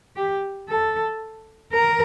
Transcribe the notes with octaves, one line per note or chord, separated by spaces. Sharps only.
G4
A4
A#4